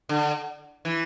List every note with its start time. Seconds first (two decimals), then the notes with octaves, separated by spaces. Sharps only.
0.09 D3
0.85 E3